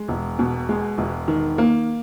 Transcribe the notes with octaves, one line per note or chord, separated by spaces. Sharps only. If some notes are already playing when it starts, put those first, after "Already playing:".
Already playing: G#3
E1
B2
G#3
E1
D#3
A#3